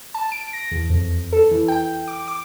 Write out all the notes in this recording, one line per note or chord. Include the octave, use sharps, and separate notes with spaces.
A5
D7
A#6
E2
F2
A4
E3
G5
D6
D6